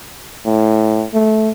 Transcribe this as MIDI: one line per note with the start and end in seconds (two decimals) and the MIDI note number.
0.46 1.05 45
1.13 1.51 57